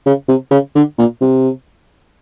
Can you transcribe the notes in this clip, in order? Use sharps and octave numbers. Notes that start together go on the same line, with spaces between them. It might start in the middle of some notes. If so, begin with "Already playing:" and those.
C#3
C3
C#3
D3
A#2
C3